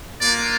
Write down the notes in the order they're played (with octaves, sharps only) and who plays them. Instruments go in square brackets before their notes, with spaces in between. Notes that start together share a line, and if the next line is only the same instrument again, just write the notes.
[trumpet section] A#3 D4 F4 D5